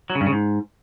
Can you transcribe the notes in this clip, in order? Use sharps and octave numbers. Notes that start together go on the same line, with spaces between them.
F#3
C#3
G2
C#3
G#2